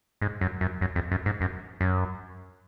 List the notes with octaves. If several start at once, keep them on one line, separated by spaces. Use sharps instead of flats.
G#2
F#2
F#2
F#2
F2
F#2
G#2
F#2
F#2